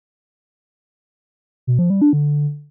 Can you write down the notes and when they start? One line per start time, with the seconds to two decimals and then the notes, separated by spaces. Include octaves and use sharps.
1.67 B2
1.79 F3
1.90 G3
2.02 D4
2.13 D3